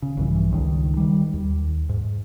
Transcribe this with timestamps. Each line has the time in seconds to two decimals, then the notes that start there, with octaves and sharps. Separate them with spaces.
0.02 C#3
0.17 A#1 G2 E3
0.52 C#2 D#3
0.97 D#3 G3
1.33 D#2
1.89 G#2